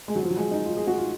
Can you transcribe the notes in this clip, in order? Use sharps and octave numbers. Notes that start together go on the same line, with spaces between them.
G#3
F#3
F3
F#3
G#3
D#4
F4
G#4
F#4
F4